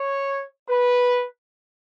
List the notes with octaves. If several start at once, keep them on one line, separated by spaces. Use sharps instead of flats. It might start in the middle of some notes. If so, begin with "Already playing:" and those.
Already playing: C#5
B4